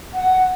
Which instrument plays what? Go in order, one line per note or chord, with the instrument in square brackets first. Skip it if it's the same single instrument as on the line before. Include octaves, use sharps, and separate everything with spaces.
[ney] F#5